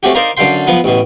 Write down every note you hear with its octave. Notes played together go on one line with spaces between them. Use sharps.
A3 C4 C#4 F#4 G4
D#4 A#4 C5 D5 F5 A#5
F#2 D3 A4 F5 G5 C6
F3 B3
A1 B2